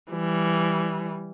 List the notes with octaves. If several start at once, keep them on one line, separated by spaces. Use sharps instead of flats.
E3 G3